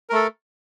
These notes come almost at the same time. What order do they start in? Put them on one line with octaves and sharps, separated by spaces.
A#4 A3 A4